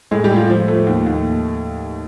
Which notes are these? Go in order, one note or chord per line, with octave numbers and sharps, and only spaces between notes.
A2 G#3 G#4
G3 G4
A2
F4
F3
A3
D#2
D#2